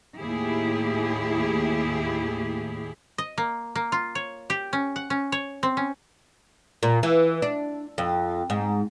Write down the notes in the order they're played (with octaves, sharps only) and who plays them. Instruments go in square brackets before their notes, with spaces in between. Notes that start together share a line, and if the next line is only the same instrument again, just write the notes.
[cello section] D#2 A2 E4 G4 G#4
[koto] D#5
A#3
A#3
F4
C#5
G4
C#4
F#5
C#4
C#5
C4
C#4
[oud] A#2
E3
D4
F2
G#2